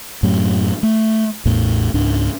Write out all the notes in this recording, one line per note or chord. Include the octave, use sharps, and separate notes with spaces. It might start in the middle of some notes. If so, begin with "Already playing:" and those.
F#2 A2 F#3
A3
A1 E2 A2
C#2 G#2 D4